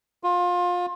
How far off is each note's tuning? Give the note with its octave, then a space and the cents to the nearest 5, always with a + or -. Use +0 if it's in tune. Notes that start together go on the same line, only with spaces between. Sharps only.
F4 +25